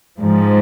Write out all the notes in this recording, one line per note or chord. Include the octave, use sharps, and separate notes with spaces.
G#2 F3